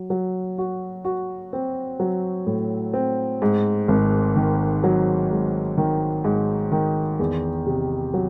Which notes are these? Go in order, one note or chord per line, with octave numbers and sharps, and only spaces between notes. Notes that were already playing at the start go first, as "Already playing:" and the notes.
Already playing: F#3
F#3
F#4
F#4
C4
F#3
A2
C4
G#2
G#1
D#3
F#3
G#2
D#3
G#2
D#3
E2
C3
F#3